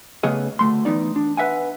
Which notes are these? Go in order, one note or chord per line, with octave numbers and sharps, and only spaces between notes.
C#3 A3 B3 G#4 D#5
D2 A3 C6
E3 A3 B3 D#4 D5
D4
B4 E5 F#5 G#5